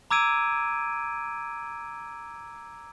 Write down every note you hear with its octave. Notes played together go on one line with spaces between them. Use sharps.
A#5 D6 E6 G#6 D7 D#7